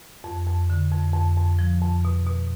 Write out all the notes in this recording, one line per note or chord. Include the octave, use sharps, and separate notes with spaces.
F2
F2
D3
F2
F2
F2
F3
F2
B2
B2